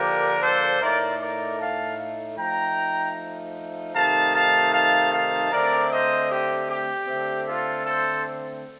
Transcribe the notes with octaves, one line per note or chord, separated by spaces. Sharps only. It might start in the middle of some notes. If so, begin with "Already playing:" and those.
Already playing: D3 F3 A#3 D4 G4 A#4
A4 C5
A2 A3 D#4 A#4 D5
A#4 D5
F5 A5
F3 A3 D#4 G5 A#5
C3 D#3 A3 D#4 F5 A5
F5 A5
F5 A5
F5 A5
D3 A3 C4 A#4 D5
C5 D#5
G4
G4
D3 A3 C4
F4 A4
A4 C5